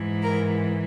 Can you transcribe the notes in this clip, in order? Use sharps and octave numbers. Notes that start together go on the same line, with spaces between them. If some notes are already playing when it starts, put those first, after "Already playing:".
Already playing: G#2 E3
A#4